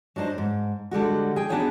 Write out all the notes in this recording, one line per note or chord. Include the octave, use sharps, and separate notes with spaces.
F#3 D4 D#4 G4 C5
G#2
D3 G3 G#3 F#4
G#4 G5
B3 D4 D#4 F#4 G#4 C#5